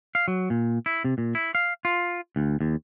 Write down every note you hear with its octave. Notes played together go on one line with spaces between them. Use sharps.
F5
F#3
A#2
E4
C3
A#2
E4
F5
F4
D2
D#2